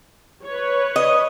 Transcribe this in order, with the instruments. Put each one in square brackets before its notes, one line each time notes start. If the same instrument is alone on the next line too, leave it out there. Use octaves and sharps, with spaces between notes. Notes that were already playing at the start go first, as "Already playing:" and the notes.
[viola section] B4 C#5
[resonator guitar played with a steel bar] D#5